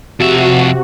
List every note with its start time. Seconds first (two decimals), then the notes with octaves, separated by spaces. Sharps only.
0.20 F2 C3 F#4 E5